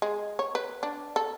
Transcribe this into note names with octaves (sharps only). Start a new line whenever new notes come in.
G#3
C#5
B4
D4
A4